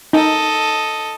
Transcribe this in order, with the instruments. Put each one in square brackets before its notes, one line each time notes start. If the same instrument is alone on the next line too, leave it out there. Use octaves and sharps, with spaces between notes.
[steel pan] D#4 [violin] A4 D#5